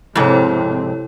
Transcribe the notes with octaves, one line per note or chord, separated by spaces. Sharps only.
F2 G#2 C3 C4 E4 A4 C#5